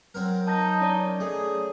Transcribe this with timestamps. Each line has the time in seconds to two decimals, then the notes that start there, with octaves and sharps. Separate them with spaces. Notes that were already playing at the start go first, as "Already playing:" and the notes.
0.14 F#3 C4 A#4
0.47 D#4 A5 G6 A#6
0.81 C#4 C#5 D5
1.20 A3 G#4